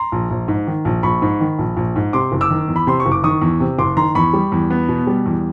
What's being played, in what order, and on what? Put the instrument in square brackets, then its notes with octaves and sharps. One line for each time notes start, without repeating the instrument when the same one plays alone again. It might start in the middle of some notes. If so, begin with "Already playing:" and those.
Already playing: [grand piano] A#5 C6
A#1
A#1
G#2
D#3
A#1
A#1 B5 C#6
G#2
D#3
A#1
A#1
G#2
C3 C6 D6
F#1
D6 E6
D#3
E2
B5
C3 C6
C#6
F#1
D6
D#3 C#6 D#6
E2
C3
F#1 C6 D6
D#3 A#5 C6
E2 B5 C#6
G3
E2
B3
B2
G3
E2